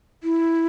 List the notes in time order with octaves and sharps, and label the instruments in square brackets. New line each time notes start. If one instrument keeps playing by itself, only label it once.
[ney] E4